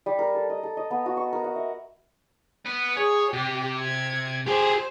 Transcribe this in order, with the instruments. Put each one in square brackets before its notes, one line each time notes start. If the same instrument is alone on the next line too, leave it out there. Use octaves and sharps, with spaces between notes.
[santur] G3
A#4
A4
D#5
A4
D#5
B3
F#4
C#6
A#4
F#5
E5
[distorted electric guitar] B3 B4
[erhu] G#4 [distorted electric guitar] C#5
[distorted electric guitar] C3 [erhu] G4
[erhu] G#6
[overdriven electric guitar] G4 G#4 [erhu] C5